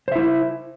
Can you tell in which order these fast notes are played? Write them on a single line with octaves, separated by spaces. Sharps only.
C5 E5 E4